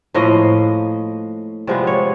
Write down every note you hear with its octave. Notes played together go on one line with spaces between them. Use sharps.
A2 F3 A#3 D#5
C3 F3 G#3 B3 D5
C#5